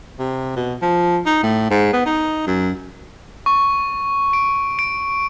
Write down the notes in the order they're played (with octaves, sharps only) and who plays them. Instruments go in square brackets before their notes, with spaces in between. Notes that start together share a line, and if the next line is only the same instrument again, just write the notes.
[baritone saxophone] C3
B2
F3
D#4
A2
G#2
B3
D#4
F#2
[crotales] C#6
D7
D7